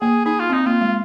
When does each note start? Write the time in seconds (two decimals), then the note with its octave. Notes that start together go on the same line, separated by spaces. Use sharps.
0.01 A#3 G#4
0.25 D#4 G#4
0.40 F4
0.50 C4 D#4
0.66 A#3 F4
0.81 G#3